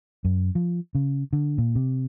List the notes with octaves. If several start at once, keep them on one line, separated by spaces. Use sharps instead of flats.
F#2
F3
C#3
D3
A#2
C3